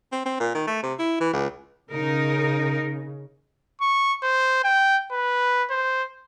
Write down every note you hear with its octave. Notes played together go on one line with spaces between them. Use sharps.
C4
C4
A#2
D#3
A3
C3
E4
E3
C#2
C#3 D#4 A#4
C#6
C5
G5
B4
C5